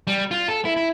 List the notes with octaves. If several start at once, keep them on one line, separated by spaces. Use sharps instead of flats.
G3
F4
A4
E4
E4